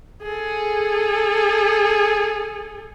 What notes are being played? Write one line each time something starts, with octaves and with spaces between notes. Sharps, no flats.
G#4 A4